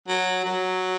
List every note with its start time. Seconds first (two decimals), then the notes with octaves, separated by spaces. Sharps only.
0.08 F#3
0.45 F#3